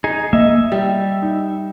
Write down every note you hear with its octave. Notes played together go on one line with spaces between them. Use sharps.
D#4 G#4
A#3 D#5 E5
G3
D#4